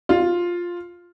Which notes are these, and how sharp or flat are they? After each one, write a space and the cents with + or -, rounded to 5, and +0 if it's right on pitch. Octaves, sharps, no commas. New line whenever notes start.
F4 +5